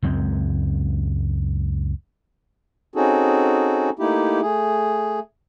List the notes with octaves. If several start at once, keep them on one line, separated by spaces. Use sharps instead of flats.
C#2 F#2 G#3 C4
C4 C#4 D#4 F#4 G#4 A4
A3 A#3 D#4 E4 G4
A3 G#4